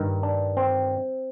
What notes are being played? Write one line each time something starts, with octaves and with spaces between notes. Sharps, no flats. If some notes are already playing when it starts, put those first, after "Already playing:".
Already playing: G2 D#3
D4
C4